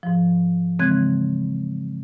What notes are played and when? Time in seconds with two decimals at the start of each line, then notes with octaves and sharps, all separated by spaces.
0.03 G#2 F3
0.79 C#3 E3 G#3 C4 F#6 G#6